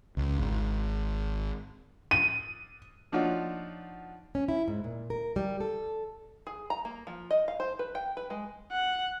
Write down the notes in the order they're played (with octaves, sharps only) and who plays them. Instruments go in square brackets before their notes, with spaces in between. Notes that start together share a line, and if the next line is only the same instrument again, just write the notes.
[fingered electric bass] C#2
G#1
[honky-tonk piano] D#7
[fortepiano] F3 D4 D#4 F4 F#4 C#5
[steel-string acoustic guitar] C#4
E4
G#2
A#2
A#4
G3
A4
[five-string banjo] G#4
A#5
A#3
F3
D#5
F5
C5
B4
G5
B4
G#3
[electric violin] F#5